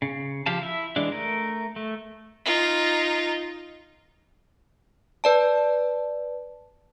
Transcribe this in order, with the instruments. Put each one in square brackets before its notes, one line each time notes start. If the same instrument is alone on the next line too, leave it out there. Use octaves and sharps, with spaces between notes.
[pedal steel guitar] C#3
F3 G4 F5 A5
E4 E5
E3 G#3 D4
A3 A#4
A3
[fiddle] D#4 F4
[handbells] B4 D5 A5